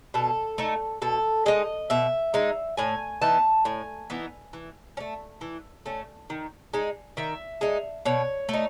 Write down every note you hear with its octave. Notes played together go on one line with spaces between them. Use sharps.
B2 A4
A3 D#4
B2 A4
G#3 D#4 D#5
B2 E5
G#3 D#4
A2 G#5
E3 B3 D#4 A5
A2 G#5
E3 B3 D#4
E3
C#4
A3
E3
A3 C#4
D#3
G#3 D#4
D#3 E5
G#3 D#4
B2 C#5
A3 D#4